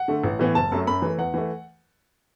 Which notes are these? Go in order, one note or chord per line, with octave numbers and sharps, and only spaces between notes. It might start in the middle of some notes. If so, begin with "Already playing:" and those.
Already playing: F#5
D3 A3
A1
A2 E3 B3
F#1 A5
F#2 F#3 A3
F#2 B5
E3 A3
E2 F#5
E3 A3